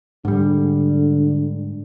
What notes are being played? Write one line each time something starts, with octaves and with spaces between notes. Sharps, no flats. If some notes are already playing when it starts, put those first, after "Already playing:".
G#2 D3 G3